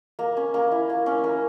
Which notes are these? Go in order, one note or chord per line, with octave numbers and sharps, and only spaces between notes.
A#3
C#4
A#3
E4
A#3
C#4
A#3